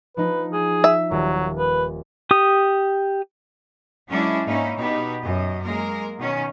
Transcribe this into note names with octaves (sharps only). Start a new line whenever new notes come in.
F3 D#4 B4
G#4 G6
E5
D#1 F#3
B4
G4 D#6
F#3 G#3 C#4 D4 E4
G#2 A#3 C#4 D#4 E4
B2 B3 D#4 G4
F#2 D#5
G#3 A#3 A#4
B2 D#3 C#4